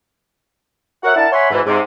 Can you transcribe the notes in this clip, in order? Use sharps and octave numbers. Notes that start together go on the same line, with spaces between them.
F#4 A#4 C#5 E5 F#5
D4 E4 A#4 F#5 A5
C#5 E5 F#5 G#5 B5 C6
G#2 B2 E3
G#2 C3